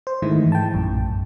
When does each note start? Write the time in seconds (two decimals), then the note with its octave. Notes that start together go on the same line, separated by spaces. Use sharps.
0.07 C5
0.22 G#2 D#3 E3 G#3 A3 E4
0.52 G5 A5
0.74 A#1 F#2 A2